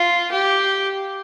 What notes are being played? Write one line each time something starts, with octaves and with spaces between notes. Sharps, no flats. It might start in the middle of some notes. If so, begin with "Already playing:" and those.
Already playing: F4
G4